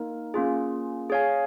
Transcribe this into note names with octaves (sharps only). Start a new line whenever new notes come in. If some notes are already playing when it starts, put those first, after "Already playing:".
Already playing: A#3 D#4 A#4
A#3 C#4 F4 G#4
G#4 C#5 F5 G#5